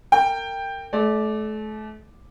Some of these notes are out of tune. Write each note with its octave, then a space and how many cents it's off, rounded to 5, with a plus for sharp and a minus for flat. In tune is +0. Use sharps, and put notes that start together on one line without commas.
A#4 -30 G5 +10
A3 -35 D5 +0